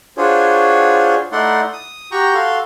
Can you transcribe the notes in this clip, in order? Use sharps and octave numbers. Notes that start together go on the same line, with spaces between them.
D4 F4 F#4 G#4 C5 C#5
A3 D#4 E4 D5 F#5 C6
D#6
F#4 G4 G5 A#5 C#6
F#4 A4 F5 C6